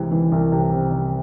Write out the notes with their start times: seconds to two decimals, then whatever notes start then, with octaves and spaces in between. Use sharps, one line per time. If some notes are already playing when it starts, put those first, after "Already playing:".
Already playing: C2 C3 E3 G#3
0.12 E3
0.32 C2
0.52 C3
0.72 C3
0.92 C3